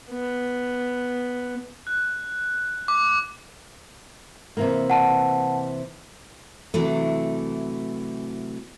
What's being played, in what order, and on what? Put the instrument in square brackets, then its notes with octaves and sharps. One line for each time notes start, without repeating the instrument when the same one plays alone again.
[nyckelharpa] B3
[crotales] F#6
D6
[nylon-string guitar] C3 E3 A#3
[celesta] F#5 A5
[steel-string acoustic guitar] C3 E3 F#3 A3